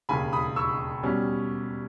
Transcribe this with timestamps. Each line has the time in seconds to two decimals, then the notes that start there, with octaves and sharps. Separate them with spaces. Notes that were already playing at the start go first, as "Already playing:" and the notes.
0.09 E1 D#2 C#3 G#5 B5
0.33 B5 D#6
0.56 C#6 E6
1.03 B2 G3 C#4